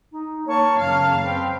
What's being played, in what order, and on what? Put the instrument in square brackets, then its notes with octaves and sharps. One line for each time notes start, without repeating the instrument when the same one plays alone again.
[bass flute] D#4
[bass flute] A#3 [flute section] C#5 A5 C#6
[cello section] F#2 C#3 F5 [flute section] A5 F6
[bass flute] C4 [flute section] B4 G5